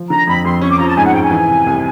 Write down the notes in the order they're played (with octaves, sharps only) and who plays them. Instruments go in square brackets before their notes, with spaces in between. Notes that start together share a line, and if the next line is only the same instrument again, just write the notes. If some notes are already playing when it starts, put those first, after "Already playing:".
Already playing: [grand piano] F3
[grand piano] D3 [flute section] A#5
[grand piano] F2 [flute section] B5
[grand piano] F2 [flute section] C6
[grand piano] C#4 [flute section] C#6
[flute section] D6
[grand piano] F3 [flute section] A#5
[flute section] A5
[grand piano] G#2 [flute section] G#5
[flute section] F#5
[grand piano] G#2 [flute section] G5
[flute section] G#5
[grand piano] E3
C3
C2